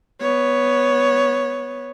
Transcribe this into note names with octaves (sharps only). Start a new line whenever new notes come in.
B3 C#5